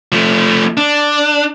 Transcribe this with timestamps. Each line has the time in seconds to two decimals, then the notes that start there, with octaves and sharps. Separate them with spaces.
0.12 F3 A3
0.77 D4